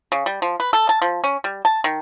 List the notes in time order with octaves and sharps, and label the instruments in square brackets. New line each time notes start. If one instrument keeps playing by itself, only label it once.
[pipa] C#3
G3
F3
B4
A4
A5
F3
C#4
G3
A5
D#3